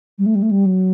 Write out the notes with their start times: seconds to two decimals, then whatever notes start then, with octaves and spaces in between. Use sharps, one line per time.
0.19 G3
0.26 A3
0.35 G3
0.43 A3
0.51 G3
0.66 F#3